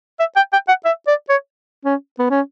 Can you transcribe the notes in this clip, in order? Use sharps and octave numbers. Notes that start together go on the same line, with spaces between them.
E5
G5
G5
F#5
E5
D5
C#5
C#4
B3
C#4